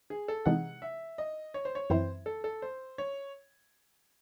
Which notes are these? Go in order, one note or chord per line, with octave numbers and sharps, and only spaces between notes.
G#4
A4
C3 E3 G#3 D#4 F#5
E5
D#5
C#5
C5
C#5
F#2 E3 C4 E4 C5
A4
A4
C5
C#5